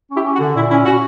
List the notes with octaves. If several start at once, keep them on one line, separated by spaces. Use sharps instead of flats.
C#4 E4 G4
C#4
F#4
D3
A#2 E4
C#4 E4
C#4 F#4